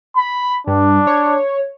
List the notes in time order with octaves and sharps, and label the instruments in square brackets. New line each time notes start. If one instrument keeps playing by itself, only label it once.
[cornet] B5
[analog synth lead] G2 [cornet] D4
[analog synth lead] C#5